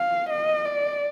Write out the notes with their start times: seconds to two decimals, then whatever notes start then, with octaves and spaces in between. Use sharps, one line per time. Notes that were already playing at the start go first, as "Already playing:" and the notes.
Already playing: F5
0.30 D#5
0.66 D5